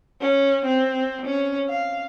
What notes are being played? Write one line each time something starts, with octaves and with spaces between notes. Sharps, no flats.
C#4
C4
C#4
F5